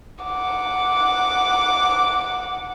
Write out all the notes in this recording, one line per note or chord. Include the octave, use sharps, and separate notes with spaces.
F#5 D6